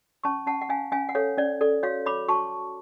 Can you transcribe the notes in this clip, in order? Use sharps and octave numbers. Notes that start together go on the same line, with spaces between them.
C#4 A5 C#6
C#4 F#5 A5
F#5
C#4 F5 G#5
C#4 F5 G#5
F#5
A4 C#5 F5
C#4 D5
A4 D5
F#4 C#5 F5
C#5 B5 D6
F#4 A5 C#6